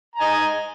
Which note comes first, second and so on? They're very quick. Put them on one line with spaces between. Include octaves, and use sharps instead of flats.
A#5 G#5 D#5